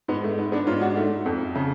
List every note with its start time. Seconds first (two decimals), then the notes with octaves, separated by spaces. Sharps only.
0.08 G#2 B3
0.24 A3
0.39 B3
0.52 B3 D4
0.67 G#2 C#4 F4
0.81 D4 F#4
0.97 A3
1.26 F2
1.55 C#3